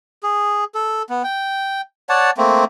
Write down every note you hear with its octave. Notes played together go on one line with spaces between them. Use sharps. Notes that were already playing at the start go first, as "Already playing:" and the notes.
G#4
A4
B3
G5
C#5 D5 F#5 A5
A3 A#3 C4